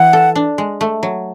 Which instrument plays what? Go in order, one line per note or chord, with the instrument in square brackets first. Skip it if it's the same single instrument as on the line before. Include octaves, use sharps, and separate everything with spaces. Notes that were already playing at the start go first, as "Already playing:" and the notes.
Already playing: [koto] E3 [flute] F#5
[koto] A4
D4
G#3
A3
F#3